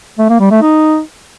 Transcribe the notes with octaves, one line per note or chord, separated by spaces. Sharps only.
A3
A#3
G3
A3
D#4